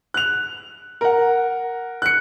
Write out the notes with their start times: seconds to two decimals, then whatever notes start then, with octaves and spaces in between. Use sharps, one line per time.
0.14 F#6 F7
1.01 A#4 F#5
2.02 F#6 C#7